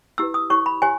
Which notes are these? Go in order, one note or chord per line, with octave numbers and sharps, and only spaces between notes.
E4 G4 B4 E6
D#6
E4 G4 C#5 C#6
B5
G4 C#5 G#5